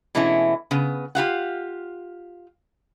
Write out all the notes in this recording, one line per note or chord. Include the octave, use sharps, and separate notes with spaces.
B2 E3 G#3 A3 C#4 E4
C#3 B3
F4 G4 F5 F#5